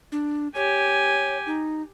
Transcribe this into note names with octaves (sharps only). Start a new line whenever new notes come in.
D4
G4 C#5 G#5
D#4